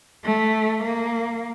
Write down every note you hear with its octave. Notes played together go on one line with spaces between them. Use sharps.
A3
A#3